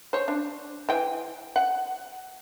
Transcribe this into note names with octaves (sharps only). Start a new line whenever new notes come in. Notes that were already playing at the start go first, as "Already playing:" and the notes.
C5 C#5
D4
E3 G5 G#5
F#5